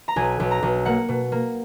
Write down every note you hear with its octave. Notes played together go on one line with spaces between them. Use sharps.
A#5
B1 G#5
B1
A#5
B1
A#3 F#5
B2
A#3